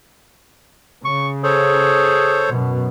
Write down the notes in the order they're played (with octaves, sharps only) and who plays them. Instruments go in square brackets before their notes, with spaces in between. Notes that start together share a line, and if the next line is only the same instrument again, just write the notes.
[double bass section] C#3 [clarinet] C#6
[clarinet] G#4 [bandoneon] A4 C5 C#5
[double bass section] F#2 B2